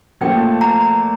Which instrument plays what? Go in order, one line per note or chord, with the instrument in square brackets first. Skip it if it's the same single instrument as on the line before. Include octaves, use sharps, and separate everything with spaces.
[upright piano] A#2 F3 A3 [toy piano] G5
[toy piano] A#5
A#5